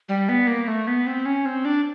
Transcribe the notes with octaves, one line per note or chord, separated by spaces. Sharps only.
G3
B3
A#3
A3
B3
C4
C#4
C4
D4